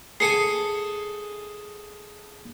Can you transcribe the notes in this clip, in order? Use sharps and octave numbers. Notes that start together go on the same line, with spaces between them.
G#4 A4 G#5 C7 C#7